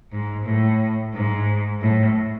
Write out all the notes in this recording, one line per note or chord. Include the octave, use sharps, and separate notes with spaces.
G#2
A2
G#2
A2